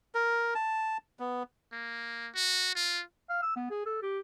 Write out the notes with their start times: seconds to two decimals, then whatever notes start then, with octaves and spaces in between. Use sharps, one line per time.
0.15 A#4
0.55 A5
1.20 B3
1.73 A#3
2.35 F#4
2.75 F4
3.29 F5
3.42 E6
3.56 B3
3.70 G#4
3.86 A4
4.02 G4